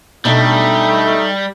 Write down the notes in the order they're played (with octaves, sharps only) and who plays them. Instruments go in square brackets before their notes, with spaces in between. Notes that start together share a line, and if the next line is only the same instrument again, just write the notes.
[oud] B2 D4 [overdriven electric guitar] G3 [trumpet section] A3 D#4